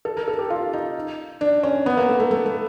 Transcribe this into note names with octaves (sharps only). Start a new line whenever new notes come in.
A4
A#4
A4
G4
F4
D#4
D4
C#4
B3
A#3
A3
A3
A3
A3